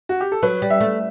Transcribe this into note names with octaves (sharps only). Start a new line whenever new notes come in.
F#4
G4
A4
F#3 B4
G3
E5
A3